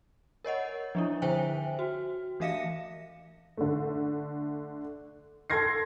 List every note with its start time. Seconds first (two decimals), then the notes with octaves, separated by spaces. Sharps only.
0.45 A#4 C#5 D#5 F#5
0.95 F3 D4 E4
1.22 D3 C5 E5 G5 G#5
1.79 F#4
2.40 E3 A3 E5 F5 A#6 C#7
3.57 D3 A3
5.50 A4 C6 G#6 A#6 C7